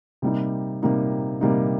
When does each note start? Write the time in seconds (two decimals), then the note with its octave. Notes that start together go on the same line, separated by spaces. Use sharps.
0.22 C3 G3 A#3 D#4
0.83 C3 G3 A#3 D#4
1.41 C3 G3 A#3 D#4